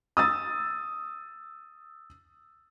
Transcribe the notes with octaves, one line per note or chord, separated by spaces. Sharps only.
D#6 E6 A6